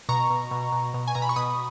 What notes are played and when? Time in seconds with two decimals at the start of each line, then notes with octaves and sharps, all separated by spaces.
0.09 B2 A#5 C#6
0.30 B2
0.51 B2
0.72 B2
0.94 B2
1.08 G#5
1.15 B2 A#5
1.22 B5
1.29 C#6
1.36 B2 B5 D#6